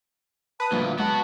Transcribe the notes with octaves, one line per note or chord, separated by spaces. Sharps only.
B4 A5 D#6
D2 A#2 F3 G3 A#3 F4
C#3 F#3 G#3 B3 F#4 A5